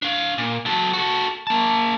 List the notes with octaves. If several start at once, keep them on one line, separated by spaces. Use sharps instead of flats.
D4 F5
A#2
F#3 A4
F#4 A4
A#3 A5